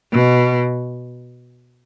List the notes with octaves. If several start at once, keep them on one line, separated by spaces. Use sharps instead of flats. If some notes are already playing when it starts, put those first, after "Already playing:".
B2